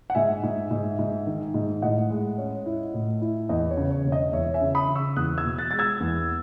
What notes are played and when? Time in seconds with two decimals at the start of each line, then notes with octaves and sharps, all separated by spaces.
0.10 F#5
0.15 G#2 E5 G#5
0.43 G#2
0.71 G#2
0.99 G#2
1.27 D#3
1.54 G#2
1.82 A2 D#5 F#5
2.10 G#3
2.38 C#4
2.66 E4
2.94 A2
3.22 E4
3.49 E2 D#5
3.71 C#5
3.77 C#3
3.91 C#5
4.05 E1
4.12 D#5
4.33 E2 C#5 E5
4.54 E5 G#5
4.61 C#3
4.75 B5 D#6
4.88 C#3
4.95 C#6 E6
5.16 E2 D#6 F#6
5.38 E6 G#6
5.44 B2
5.58 F#6 A6
5.71 G#3 A6
5.79 E6 G#6
6.00 E2